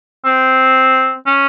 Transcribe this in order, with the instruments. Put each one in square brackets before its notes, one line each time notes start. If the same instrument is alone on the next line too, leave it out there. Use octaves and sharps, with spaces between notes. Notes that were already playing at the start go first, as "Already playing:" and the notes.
[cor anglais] C4
C#4